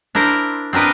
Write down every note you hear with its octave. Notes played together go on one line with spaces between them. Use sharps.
D4 E4 A#4 C5
C4 D4 A#4 B4 D#5